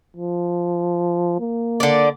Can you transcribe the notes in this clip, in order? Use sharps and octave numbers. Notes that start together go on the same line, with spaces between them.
F3
A#3
D3 D5